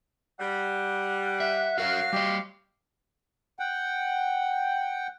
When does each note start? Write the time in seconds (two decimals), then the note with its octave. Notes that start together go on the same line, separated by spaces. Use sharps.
0.40 G3 F#5
1.40 E5
1.78 F#3 F#4 A#4 C#5 F5
2.13 G3 G4 D#5
3.59 F#5 G5